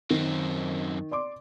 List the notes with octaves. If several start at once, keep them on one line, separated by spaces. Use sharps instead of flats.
F#2 D#3 C4
D5 C6 D6